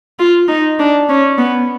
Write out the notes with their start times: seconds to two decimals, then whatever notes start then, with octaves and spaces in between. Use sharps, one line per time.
0.19 F4
0.48 D#4
0.79 D4
1.09 C#4
1.38 B3